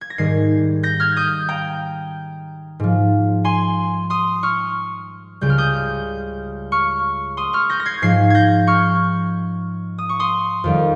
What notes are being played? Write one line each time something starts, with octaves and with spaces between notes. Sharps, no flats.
G#6
A#6
G#2 D#3 G3 G#6 C7
G6 A#6
F6 G#6
D#6 G6
G5 A#5
G#2 F3
G#5 C6
C6 D#6
C#6 F6
C#2 C#3 G3 G6
F6
D#6 G6
C#6 F6
C6 D#6
C#6 F6
G6 A#6
A#6
G#6 C7
G#2 F3 G#6 C7
G6 G#6 A#6
C#6 F6
D#6
C#6
C6 D#6
F2 D#3 G3